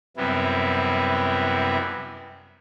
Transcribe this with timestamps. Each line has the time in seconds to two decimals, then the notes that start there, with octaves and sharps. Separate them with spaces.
0.17 F#2 C3 G3 B3 E4